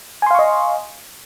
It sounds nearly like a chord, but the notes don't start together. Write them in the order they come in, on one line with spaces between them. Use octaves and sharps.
G#5 C6 F5 C#6 D#5